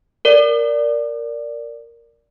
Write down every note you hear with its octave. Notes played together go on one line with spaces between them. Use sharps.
A#4 D5